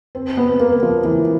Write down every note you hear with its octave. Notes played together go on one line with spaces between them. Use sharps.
C4
B3
A#3
F3
E3